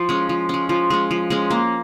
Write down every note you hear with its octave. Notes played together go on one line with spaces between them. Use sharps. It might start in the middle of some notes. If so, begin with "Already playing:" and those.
Already playing: F3
G#3 C#4
F3
G#3 C#4
F3
G#3 C#4
F3
G#3 C#4
A#3